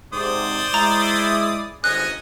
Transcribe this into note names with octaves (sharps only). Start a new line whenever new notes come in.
G#2 C3 C5 D5 D#6
G#3 E4 A#5
G1 G#2 C#4 D#5 G#5 F#6